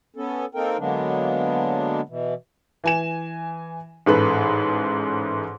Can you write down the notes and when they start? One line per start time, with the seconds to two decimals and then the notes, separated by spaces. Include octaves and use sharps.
0.16 B3 C#4 A4
0.55 A#3 C4 D#4 A4 A#4 G5
0.78 D3 F#3 G#3 A#3 B3 D4
2.09 B2 E3
2.84 E3 G#5 E7
4.06 A1 G#2 A4 B4